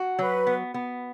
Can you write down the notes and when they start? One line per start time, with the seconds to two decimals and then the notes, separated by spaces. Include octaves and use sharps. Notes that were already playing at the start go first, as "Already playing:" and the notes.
Already playing: F#4
0.19 F#3 B4
0.47 B3
0.74 B3